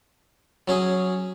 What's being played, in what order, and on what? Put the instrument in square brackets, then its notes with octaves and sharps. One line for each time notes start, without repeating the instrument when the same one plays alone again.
[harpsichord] F#3 C#4 G#4